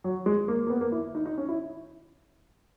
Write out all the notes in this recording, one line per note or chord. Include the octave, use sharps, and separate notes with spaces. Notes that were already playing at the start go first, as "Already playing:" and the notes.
F#3
G#3
A#3
A#3
B3
A#3
E4
D#4
D#4
C#4
E4